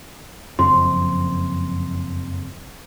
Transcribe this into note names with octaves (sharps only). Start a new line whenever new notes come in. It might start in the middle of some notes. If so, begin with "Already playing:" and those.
F#1 F2 F3 C6